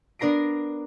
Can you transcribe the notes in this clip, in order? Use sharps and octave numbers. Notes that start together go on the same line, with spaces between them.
B3 D4 A#4 A#5 C7 D7